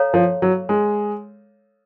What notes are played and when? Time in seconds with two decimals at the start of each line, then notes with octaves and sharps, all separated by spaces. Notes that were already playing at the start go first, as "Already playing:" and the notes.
Already playing: A4 C#5 F5 A#5
0.14 F3
0.42 F#3
0.69 G#3